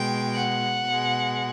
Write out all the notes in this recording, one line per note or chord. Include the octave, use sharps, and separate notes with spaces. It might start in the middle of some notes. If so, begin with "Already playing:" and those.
Already playing: B2 G#3 G5
F#5
B2 G#3